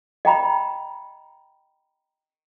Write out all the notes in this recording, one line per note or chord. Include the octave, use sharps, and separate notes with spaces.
D#5 G5 A#5 B5